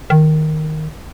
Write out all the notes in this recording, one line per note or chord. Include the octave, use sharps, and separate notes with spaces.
D#3